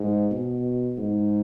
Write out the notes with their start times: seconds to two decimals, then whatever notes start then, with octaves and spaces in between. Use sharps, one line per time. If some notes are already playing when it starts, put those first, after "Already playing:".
Already playing: G#2
0.31 B2
0.97 G#2